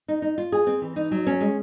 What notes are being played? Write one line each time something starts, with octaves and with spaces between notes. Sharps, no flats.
D#4
D#4
F4
G#4
C4
E3
D#4
F#3
C#4
G#3